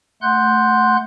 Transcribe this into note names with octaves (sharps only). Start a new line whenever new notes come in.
A3 F#5 C6 F#6 G6